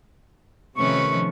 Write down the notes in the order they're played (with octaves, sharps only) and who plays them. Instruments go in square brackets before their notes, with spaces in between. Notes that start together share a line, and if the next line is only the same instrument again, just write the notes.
[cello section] C3 D#3 F3 [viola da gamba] A3 C#4 B4 [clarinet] C#6